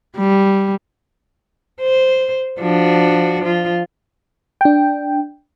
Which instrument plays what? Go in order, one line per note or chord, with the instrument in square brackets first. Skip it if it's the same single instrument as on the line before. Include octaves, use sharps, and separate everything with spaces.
[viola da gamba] G3
C5
F3 D4 F#4
F3 F4
[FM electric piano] D4 G5